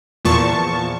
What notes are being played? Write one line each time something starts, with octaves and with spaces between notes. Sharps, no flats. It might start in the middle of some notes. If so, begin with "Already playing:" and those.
E2 A#2 F3 A5 C#6